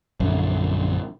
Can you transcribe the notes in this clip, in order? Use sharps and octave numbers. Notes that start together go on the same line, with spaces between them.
A#1 F#2 D3